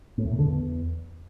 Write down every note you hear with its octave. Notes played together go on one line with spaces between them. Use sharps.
A2
E2
A#2
D3
E2